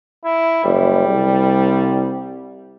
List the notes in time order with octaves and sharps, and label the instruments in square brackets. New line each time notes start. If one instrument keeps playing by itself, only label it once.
[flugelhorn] E4
[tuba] F#1 [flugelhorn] G3
[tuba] C2